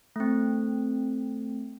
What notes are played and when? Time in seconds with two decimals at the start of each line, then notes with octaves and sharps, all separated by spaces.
0.16 A3 C4